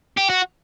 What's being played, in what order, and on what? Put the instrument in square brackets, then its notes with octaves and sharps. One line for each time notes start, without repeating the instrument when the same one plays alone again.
[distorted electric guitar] G4
F#4